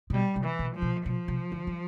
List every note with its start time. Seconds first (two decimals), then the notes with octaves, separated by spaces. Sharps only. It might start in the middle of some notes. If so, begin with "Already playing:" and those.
0.10 C3
0.13 B2 G3
0.36 C3
0.44 E3
0.59 B2
0.75 F3
0.82 B2
1.06 B2 F3
1.28 C3
1.52 D3
1.67 G3